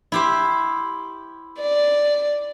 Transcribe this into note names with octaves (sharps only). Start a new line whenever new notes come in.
E4 G4 C5
D5